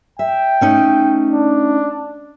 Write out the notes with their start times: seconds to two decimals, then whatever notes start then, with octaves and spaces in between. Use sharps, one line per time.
0.19 E5 G5
0.61 A3 C#4 D#4
1.31 D4